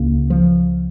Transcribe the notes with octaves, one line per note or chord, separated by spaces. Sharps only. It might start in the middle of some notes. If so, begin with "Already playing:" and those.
Already playing: C#2 C#3 A#3
F3